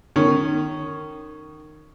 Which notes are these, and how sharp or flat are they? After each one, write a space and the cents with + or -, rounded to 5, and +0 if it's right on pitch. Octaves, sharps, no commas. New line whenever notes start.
D#3 -20 C#4 +0